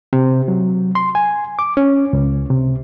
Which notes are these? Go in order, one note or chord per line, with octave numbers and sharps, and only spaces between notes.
C3
F#3
C6
G#5
D6
C#4
C#2
C3